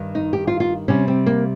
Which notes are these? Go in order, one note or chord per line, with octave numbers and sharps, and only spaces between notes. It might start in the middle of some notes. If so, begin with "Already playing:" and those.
Already playing: G2 D#3 G3
D#4
G4
F4
F4
C3 G3 C#4
C4
A#3